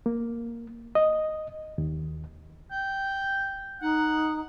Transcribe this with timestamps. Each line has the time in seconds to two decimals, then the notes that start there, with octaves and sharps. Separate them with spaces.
0.06 A#3
0.95 D#5
1.78 D#2
2.72 G5
3.82 D#4 F#5